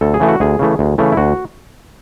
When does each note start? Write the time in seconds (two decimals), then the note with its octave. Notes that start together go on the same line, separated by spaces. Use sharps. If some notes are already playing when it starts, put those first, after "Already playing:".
0.01 D2 A4
0.14 G#4
0.20 C#3 E3 A3
0.28 F#4
0.40 D2 G#4
0.59 C#3 E3 A3
0.79 D2
0.98 C#3 E3 A3
1.12 E4
1.17 D2 F#4